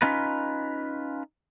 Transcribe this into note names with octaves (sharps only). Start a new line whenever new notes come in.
C#4 D#4 F4 B4